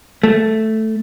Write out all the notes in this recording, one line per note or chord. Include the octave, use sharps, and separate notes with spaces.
A3